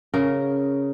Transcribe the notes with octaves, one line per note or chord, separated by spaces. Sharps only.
C#3 A#4